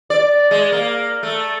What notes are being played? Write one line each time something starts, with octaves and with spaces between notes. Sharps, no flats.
D5
G#3
A#3
A3